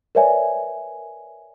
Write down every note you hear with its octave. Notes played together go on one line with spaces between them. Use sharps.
A#4 B4 C#5 D5 E5 G#5